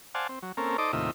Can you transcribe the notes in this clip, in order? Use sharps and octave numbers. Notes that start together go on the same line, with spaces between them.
C5 D5 F5 F#5 G#5 A5
C4
F#3
A#3 C4 C#4 A4 A#4
D#4 A4 C5 D5 D#5 D6
D#2 A2 C3 F4 D#5 E5